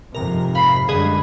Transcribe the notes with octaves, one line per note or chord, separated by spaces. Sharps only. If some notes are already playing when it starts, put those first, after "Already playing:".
F2 G#2 C3 A#4 A#5
F5 B5 C7
F#2 D3 G3 G#3 G#4 B4 D#5